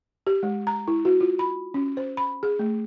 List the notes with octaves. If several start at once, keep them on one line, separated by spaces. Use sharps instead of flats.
G4
G#3
A#5
E4
F#4
F4
B5
C#4
C5
B5
G#4
A3